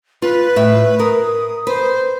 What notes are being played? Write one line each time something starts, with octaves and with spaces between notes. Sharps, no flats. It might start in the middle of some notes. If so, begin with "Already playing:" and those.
F4 B4
A2 E5
A#4 D#6
B4 C5